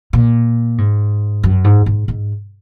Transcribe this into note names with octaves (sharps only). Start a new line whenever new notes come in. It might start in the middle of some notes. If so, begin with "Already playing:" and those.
A#2
G#2
F#2
G#2
G#2
G#2